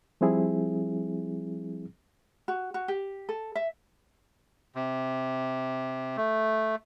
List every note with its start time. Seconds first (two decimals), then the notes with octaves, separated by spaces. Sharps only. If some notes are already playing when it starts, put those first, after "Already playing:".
0.21 F3 G3 C4 E4 G#4
2.48 F#4
2.74 F#4
2.88 G4
3.29 A4
3.55 E5
4.75 C3
6.17 A3